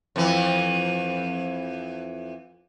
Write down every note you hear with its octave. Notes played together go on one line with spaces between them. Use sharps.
F2 E3